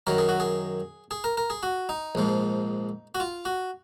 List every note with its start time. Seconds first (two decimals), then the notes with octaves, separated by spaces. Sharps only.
0.07 F#2 D#3 F#3 A#4
0.18 G#4
0.29 F#4
0.40 G#4
1.11 G#4
1.24 A#4
1.37 A#4
1.50 G#4
1.63 F#4
1.89 D#4
2.15 A#1 G#2 F3
3.15 F#4
3.20 F4
3.45 F#4